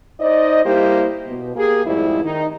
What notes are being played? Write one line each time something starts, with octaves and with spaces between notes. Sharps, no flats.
D#4 C5 D5 D#5
G3 A#3 E4 G4 C5
B2
A#3 G4 G#4
F2 G#2 G3 A3 E4
D#3 D#4